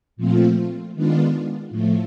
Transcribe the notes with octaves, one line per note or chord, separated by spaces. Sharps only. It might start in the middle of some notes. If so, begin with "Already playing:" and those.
A#2 F3 A3 C4 F4
D#3 G#3 B3 D4 F4
A2 F3 A3